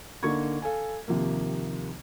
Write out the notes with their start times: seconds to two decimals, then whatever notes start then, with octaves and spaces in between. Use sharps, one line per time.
0.23 D3 A#3 D#4 C#6 G#6
0.62 A4 F5 G#5
1.08 D#2 C3 F3 A#3